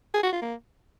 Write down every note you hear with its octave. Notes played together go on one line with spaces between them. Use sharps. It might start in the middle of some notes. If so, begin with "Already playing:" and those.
G#4
F#4
F4
A#3